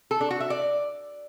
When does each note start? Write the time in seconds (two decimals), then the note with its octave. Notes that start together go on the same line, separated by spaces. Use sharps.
0.11 A4
0.21 D4
0.31 F#4
0.40 E5
0.50 D5